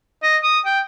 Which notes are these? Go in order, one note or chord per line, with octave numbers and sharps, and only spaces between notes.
D#5
D#6
G5